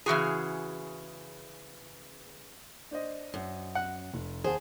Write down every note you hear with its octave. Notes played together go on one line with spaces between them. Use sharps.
C#3 E3 F#4 G#4
D4 C5 D#5
F#2
F#5
F1
D#2 G#4 C5 F#5 A5